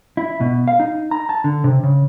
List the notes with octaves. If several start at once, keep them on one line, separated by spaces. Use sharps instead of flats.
E4
B2
F5
D#4
A#5
A5
D3
C3
C#3